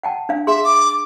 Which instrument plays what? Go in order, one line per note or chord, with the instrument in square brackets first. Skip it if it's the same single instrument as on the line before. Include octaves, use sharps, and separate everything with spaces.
[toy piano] F#5 G5 A5
D4 F5
[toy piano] G#4 C6 [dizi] E5
[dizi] D6